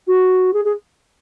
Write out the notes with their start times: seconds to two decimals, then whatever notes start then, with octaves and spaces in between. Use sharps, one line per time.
0.07 F#4
0.53 G#4
0.65 G#4